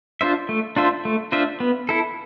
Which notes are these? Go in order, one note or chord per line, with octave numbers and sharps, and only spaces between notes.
D4 F4 C5 E5
A3
D4 F4 C5 E5
A3
D4 F4 C5 E5
B3
E4 A4